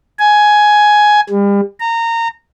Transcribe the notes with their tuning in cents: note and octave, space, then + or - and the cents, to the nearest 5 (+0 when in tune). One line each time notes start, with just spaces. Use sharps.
G#5 +10
G3 +40
A#5 -20